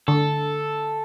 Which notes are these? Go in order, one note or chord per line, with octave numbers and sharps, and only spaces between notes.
D3 A4